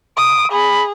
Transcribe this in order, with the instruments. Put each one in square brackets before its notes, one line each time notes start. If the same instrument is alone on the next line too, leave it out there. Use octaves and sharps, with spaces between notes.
[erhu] D#6 [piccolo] D7
[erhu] G#4 [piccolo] B5